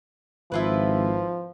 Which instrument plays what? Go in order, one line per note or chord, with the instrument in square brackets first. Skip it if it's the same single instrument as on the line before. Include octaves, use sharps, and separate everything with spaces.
[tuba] G#1 [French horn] F3 [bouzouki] E4 F4 B4